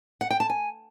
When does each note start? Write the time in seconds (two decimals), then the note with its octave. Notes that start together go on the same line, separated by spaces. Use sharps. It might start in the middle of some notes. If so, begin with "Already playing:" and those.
0.21 F#5
0.30 G5
0.40 A5
0.50 G#5